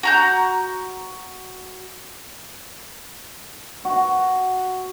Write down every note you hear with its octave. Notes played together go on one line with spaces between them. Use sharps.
F#4 A#5 G6
F#4